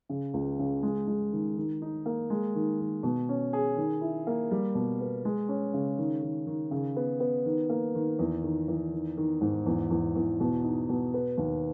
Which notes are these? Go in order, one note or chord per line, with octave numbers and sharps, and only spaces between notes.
C#3
C#2
C#3
G#3
G#3
D#3
D#3
D#4
A#3
G#3
D#3
D#3
B2
C#4
G#4
D#3
E4
A#3
G3
B2
B3
G#3
C#4
C#3
D#3
D#3
D#3
C#3
B3
B3
D#3
A#3
D#3
E2
D#3
E2
D#3
D#3
G#2
E2
E2
E2
B2
D#4
B2
B3
D#2